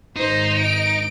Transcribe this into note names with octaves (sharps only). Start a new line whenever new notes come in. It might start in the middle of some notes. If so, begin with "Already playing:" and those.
G#1 G#2 D#4 C5
D7